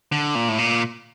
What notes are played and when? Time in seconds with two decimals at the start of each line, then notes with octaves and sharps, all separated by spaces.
0.12 D3
0.35 A#2
0.48 A2
0.58 A#2